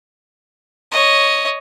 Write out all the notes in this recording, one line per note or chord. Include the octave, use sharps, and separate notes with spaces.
C#5 D#5